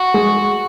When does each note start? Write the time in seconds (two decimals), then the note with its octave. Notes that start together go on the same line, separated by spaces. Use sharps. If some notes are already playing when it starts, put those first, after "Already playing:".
Already playing: F#4
0.14 G#3